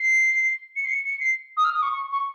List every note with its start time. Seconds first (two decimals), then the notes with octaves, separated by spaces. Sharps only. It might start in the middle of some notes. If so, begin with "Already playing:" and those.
Already playing: C7
0.76 C#7
0.85 C7
0.90 C#7
1.06 C#7
1.20 C7
1.57 D#6
1.64 F6
1.74 D#6
1.82 C#6
1.93 C#6
2.12 C#6